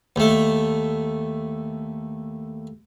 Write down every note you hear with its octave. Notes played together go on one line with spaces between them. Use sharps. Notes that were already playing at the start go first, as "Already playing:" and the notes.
D#2 A3